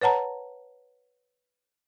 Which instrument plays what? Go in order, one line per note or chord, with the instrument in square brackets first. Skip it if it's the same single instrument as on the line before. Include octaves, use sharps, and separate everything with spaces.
[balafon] B4 C#5 F#5 A5 A#5